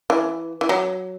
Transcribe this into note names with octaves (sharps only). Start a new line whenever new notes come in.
E3
E3
F#3